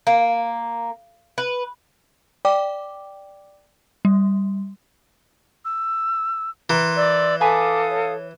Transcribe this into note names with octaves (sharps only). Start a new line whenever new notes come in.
A#3
B4
D5 G5 D6
G3
E6
E3 A#4 C6
D5 E6
A4 B4 F5 G#5 A5 D6 D#6
C#5